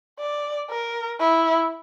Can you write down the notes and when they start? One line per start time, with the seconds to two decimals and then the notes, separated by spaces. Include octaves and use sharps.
0.20 D5
0.69 A#4
1.20 E4